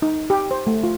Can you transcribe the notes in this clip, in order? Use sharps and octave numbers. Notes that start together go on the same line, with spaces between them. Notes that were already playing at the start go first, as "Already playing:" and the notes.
D#4
G4
C5
A3
F4